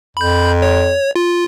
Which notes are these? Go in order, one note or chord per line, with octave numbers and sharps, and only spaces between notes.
F2 B5 G6
C#5
F4